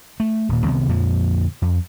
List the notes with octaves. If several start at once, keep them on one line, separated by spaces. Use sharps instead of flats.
A3
D#1 A#2
C2 C3 D#3 B3
F2 A#2 D3 F3
F2